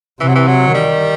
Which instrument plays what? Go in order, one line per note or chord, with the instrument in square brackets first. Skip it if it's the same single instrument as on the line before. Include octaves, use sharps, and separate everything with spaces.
[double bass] C3 [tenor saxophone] E3
[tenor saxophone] F#3
E3
F#3
[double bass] D#3 [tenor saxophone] G3